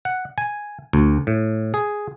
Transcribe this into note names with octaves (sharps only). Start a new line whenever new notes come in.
F#5
G#5
D2
A2
G#4